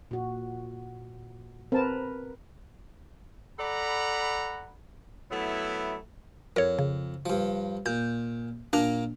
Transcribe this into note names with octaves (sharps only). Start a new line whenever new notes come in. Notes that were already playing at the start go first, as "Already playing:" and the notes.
A#2 F#4
C4 A#4 B4 A5
A4 D5 F#5 A#5 B5
F#3 A3 B3 E4
F2 A#4 C#5
C#3
G2 F3
A#2 G6
A#2 A#3 D4 A#5